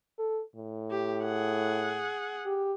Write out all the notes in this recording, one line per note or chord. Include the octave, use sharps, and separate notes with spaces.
A4
A2
G4
G#4 F#5
G4